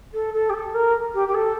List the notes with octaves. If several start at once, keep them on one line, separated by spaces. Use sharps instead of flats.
A4
A4
G4
A4
A#4
G4
G4
A4